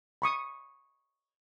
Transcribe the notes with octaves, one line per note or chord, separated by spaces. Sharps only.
B5 C#6 D#6